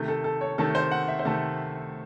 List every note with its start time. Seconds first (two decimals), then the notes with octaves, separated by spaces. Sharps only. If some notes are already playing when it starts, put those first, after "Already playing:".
Already playing: C3 D#3 A3
0.08 A4
0.24 A4
0.41 C#5
0.58 C3 D#3 A3 A4
0.75 C5
0.91 F#5
1.08 E5
1.19 C5
1.25 C3 D#3 A3 A4